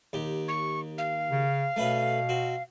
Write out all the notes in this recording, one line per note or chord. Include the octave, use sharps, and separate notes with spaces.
D#2 G4
C#6
F5
C#3
B2 A3 C#4 B4
C4 F#4